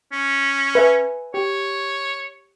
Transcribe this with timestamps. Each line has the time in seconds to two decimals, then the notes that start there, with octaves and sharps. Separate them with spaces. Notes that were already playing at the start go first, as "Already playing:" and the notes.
0.12 C#4
0.75 B4 E5 G#5
1.34 G4 C#5